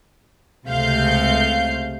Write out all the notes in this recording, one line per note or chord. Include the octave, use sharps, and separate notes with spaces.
C#2 C3 A3 F5 G6